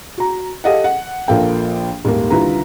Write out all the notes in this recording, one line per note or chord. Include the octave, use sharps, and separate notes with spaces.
F#4 A#5
G4 A4 D#5 F5 F#5
F#5
A#1 F3 A#3 A4 F5 G5
D#1 G#1 D#3 A#3
C2 D3 D#3 F4 B4 A#5